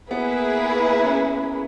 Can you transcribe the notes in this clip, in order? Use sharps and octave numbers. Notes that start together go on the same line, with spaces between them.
A#3 B3 E4 G#4 B4
C#4